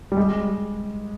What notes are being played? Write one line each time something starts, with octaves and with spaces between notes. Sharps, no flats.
G3
G#3